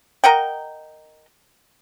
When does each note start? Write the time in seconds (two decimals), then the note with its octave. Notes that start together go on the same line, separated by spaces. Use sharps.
0.24 A#4 D#5 F#5 G5